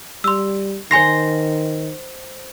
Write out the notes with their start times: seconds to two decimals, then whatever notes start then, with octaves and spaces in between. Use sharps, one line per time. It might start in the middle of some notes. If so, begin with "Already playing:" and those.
0.24 G3 C6 E6
0.91 D#3 C5 G#5 C6 A#6 C7